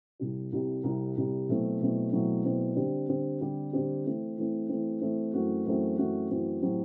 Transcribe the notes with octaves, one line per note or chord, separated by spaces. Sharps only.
C2 C3 G3
C2 C3 G3
C2 C3 G3
C2 C3 G3
B2 F#3 A3 C4 E4
B2 F#3 A3 C4 E4
B2 F#3 A3 C4 E4
B2 F#3 A3 C4 E4
D3 G3 C4 G4
D3 G3 C4 G4
D3 G3 C4 G4
D3 G3 C4 G4
E3 A3 C4
E3 A3 C4
E3 A3 C4
E3 A3 C4
F#2 E3 A3 C4 F#4
F#2 E3 A3 C4 F#4
F#2 E3 A3 C4 F#4
F#2 E3 A3 C4 F#4
A2 F#3 C4 G4